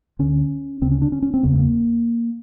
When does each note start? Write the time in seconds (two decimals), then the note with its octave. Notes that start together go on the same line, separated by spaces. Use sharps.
0.19 D2 D3 C#4
0.81 D2 C#3 C4
0.91 C#4
1.02 D4
1.12 C#4
1.22 C#4
1.34 C4
1.43 F#1 E2 C#3 B3
1.53 A3
1.59 A#3